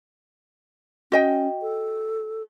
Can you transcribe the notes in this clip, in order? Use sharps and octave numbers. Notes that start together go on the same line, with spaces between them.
C#4 F#4 D#5 G5
A4